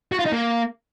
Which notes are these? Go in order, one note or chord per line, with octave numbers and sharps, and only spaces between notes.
F#4
F4
D#4
A#3